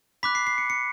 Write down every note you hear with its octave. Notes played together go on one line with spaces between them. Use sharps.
B5 D6 F#6 B6
C7
C7
C#7
C#7